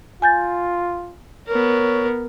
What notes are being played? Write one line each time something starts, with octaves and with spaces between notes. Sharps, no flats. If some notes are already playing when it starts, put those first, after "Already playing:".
F4 G#5 G6 A6
B3 A#4 C#5